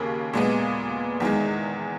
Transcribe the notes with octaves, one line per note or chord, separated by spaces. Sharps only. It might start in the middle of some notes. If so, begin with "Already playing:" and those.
Already playing: D#2 C#3 A#3
A#2 G#3 B3
E2 D#3 G#3